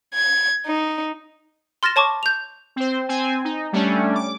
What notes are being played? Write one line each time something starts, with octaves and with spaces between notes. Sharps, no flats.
G#6
D#4
C6 F6 A6 A#6 E7
C#5 A5 C#6 D6
G6 F7
C4 C5
C4 G#5
D#4
G3 A3 C#4 D4
D6